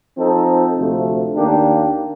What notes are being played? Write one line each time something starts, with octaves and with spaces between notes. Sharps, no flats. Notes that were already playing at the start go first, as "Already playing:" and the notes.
F3 C4 D#4 A4 C5
D2 C3 F3 A3
D#2 D#3 A#3 D4 G4